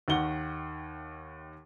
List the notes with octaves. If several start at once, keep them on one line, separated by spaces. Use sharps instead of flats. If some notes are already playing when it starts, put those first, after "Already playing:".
D#2 D#3 F#5 G7